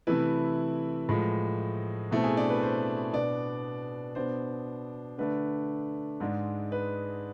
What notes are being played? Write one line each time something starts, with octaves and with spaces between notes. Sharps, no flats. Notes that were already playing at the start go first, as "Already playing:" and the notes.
C3 E3 A3 E4 B4
A2 F3 G#3
B2 A3 C4 E4
G#4 G#5
D4 D5
B4
C5
B2 B3 D4 D5
B2 B3 D4 C5
D3 A3 D4 B4
G#2 G#3 D4
B4